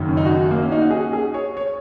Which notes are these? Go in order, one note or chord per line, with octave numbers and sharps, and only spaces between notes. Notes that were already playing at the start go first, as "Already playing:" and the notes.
Already playing: F#1 F#2 D#3 F#3
C#4
D#4
F#4
A#3
C#4
D#4
F#4
G#4
G#4
C#5
C#5